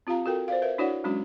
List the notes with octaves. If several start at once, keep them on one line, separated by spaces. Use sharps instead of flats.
C4 F4 G4 F5 A#5
F#4 A4 A#4 G5
C5 D5 F5
A#4 B4 E5
D4 E4 F#4 C#5 D5 F#5
F#3 G#3 C#4 D4 F#4